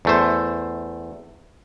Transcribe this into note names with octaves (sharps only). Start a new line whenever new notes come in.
E2 A3 C5